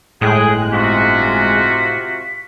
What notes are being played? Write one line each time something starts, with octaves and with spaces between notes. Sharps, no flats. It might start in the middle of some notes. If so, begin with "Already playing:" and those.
G1 A2 G#3 G#4 G5 D#6 F#6
C3 F4 F#4 B6